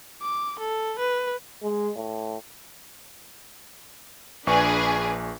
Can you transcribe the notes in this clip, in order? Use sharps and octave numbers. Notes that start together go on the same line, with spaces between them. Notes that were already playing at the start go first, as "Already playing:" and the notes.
D6
A4
B4
G#3
A2
A#1 D4 G#4 B4 C#6